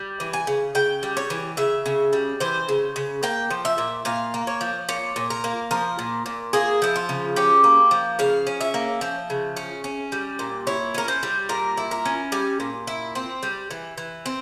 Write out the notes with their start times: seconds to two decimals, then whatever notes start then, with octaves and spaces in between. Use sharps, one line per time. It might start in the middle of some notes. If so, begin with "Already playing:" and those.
Already playing: G3
0.20 E3
0.33 G#5
0.47 C#3
0.75 C#3 G5
1.03 G3
1.17 C#5
1.30 E3
1.57 C#3 E5
1.86 C#3
2.13 G3
2.40 E3 C5
2.69 C#3
2.96 C#3
3.23 A#3 G5
3.51 F3
3.65 E5
3.78 A#2
4.05 A#2 F5
4.34 A#3
4.47 C#5
4.61 F3
4.89 A#2 C#5
5.16 A#2
5.30 A#4
5.44 A#3
5.71 F3 A#4
5.99 A#2
6.26 A#2
6.53 A#3 G#4
6.82 F3 E4
6.96 F4
7.09 C#3
7.36 C#4 G4
7.64 A#3
7.91 F3
8.19 C#3 F5
8.47 C#4
8.61 E5
8.74 A#3
9.01 F3
9.30 C#3
9.57 C#4
9.84 C#4
10.12 G3
10.39 A#2
10.67 E4 C#5
10.94 C#4 A#4
11.08 C5
11.23 G3
11.49 A#2 A#4
11.77 E4
11.91 A#4
12.05 C#4
12.32 G3 G#5
12.60 A#2
12.87 E4
13.15 C4
13.43 G3
13.70 E3
13.97 E3
14.26 C4